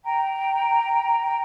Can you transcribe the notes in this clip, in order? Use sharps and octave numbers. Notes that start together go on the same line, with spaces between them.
G5 A#5